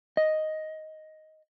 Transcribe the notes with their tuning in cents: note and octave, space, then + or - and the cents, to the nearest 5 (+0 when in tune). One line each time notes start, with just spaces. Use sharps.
D#5 +5